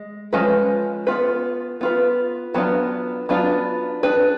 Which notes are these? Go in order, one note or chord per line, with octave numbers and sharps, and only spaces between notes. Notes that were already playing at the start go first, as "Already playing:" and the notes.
Already playing: G#3
F3 G#3 C#4 F4 B4
B3 F4 B4
B3 F4 B4
F#3 B3 D4 F4
F#3 B3 D4 F4
D4 G#4 B4